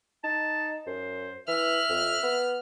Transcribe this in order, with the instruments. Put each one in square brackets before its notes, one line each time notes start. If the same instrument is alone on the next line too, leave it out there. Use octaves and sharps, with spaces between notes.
[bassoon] D#4 [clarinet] A5
[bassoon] F#2 [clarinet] C5
[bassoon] E3 [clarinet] E5 [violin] F6 F#6
[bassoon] F2
B3